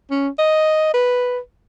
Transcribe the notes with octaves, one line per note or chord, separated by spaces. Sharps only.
C#4
D#5
B4